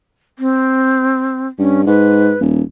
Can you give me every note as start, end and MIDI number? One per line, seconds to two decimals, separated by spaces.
0.39 1.47 60
1.59 1.85 43
1.59 1.81 61
1.86 2.34 44
1.86 2.39 71
2.41 2.62 27